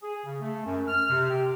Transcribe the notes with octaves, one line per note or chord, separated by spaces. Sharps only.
G#4
C#3
A3
F#2
F6
C3
G4